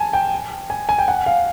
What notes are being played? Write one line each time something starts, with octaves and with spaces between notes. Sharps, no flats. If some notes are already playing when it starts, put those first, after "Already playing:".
Already playing: G#5 A5
G5
G#5
G#5
G5
F#5
F5